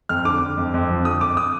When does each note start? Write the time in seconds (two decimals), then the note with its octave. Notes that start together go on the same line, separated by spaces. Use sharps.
0.09 F2 F6
0.25 D3 D6
0.41 D3
0.58 F2
0.74 F2
0.89 F3
1.05 D3 D#6
1.21 F2 D6
1.37 D#6